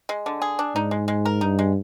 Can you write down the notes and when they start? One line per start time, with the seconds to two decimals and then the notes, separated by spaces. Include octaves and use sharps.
0.09 G#3
0.26 D3
0.42 G#4
0.59 D4
0.75 G#2 D#4
0.91 G#3
1.08 G#3
1.25 A#4
1.41 G2 D#4
1.59 G#3